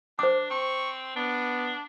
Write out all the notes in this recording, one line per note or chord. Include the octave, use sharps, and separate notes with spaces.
D4 C5 D6
C4 C#6
B3 D4